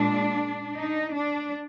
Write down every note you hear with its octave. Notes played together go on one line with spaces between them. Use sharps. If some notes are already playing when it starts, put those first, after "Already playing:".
Already playing: A#2 G#3 D4
D#4
D4